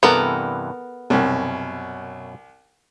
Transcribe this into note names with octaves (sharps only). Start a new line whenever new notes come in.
G2 C3 E3 B3 A4 A#4
C2 F#2 B2 C#4